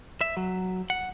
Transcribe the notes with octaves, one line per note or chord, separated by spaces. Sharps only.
E5
F#3
F#5